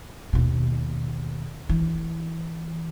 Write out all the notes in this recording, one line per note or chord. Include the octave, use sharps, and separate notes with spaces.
D#2 B2
E3